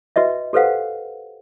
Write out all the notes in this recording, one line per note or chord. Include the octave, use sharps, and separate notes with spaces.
F#4 B4 D#5 E5
G4 A4 B4 C5 F5 F#5